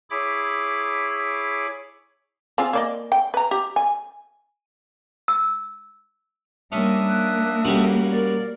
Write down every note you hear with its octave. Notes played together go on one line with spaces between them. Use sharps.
E4 G#4 C#5 B5 D6
C4 F4 G#4
A#3 D5 D#5
G5
B4 A#5
G4
G#5
E6
G3 A#3 C#4 D4 E5 D#6
A#3 F#6
G3 C#4 F#4 A4
A#4 D5